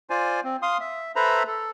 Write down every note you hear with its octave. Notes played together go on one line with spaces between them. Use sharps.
F4 C5 D5 G#5
C4
F5 C6 D#6
E5
A4 B4 C5 E5 A#5 B5
A4